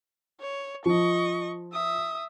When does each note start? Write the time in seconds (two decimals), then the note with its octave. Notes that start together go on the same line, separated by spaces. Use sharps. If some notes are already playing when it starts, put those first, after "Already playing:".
0.40 C#5
0.86 F3 D#5 C#6
1.73 E5 D#6